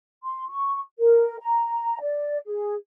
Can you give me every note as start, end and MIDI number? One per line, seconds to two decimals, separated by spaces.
0.24 0.47 84
0.48 0.80 85
0.98 1.36 70
1.40 1.98 82
2.00 2.38 74
2.47 2.74 68